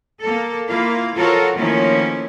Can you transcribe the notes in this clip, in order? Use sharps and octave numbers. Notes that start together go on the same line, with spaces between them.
A#3 A4
A#3 E4 F4 F5
F3 F4 F#4 A4 A#4 C#5
D#3 F3 A3 A#3 C#4 E4